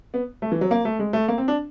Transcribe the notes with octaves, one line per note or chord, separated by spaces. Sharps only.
B3
A3
E3
F#3
A#3
A3
G#3
A3
A#3
C4
D4